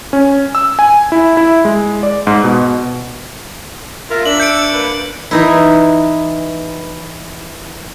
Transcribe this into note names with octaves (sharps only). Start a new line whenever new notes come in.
C#4
E6
G#5
E4
E4
G#3
D5
G#2
B2
A#3 F4 A#4 E5
D4 E5 E6 F#7
G6 C#7 D7
A#3 B4
E3 D#4 E4